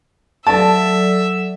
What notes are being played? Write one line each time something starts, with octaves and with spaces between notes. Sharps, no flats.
F#3 A4 D5 E5 A5